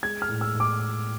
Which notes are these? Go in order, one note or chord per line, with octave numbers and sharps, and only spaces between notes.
G#3 G#6
F6
A2
E6
A2
D6